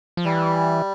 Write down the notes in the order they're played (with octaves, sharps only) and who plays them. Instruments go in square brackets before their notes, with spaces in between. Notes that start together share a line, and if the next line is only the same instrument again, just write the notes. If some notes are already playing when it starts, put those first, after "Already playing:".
[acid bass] F3
[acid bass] E3 [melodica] G3